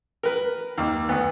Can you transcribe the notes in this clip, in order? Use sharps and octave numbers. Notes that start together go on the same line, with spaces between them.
A#4 B4
D#2
D2 B3